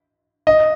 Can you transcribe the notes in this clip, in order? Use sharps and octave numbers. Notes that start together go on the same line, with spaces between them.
D#5